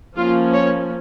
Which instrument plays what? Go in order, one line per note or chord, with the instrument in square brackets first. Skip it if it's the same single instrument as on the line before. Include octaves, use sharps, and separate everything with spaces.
[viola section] F3 A#3 C#4 F4
C#5